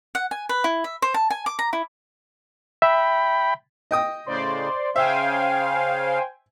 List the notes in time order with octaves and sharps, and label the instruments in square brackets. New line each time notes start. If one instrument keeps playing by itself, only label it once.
[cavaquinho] F#5
G#5
B4
E4
E5
C5
A5
G#5
D6
A#5
E4
[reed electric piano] E5 [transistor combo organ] G5 B5
[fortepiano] D#5 G5 D#6
[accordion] A2 C#3 [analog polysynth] C5 D5 C6
[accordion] C#3 F5 [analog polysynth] C5 G5 G#5 [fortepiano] E5